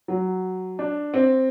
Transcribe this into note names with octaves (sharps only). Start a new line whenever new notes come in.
F#3
D4
C4